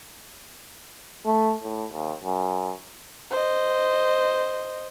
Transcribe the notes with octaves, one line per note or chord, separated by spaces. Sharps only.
A3
A2
D#2
F#2
C5 D#5